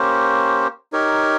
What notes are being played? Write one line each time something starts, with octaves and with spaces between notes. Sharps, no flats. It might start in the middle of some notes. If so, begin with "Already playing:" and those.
Already playing: A#3 C#4 G4 C5
D#4 G4 A#4 C#5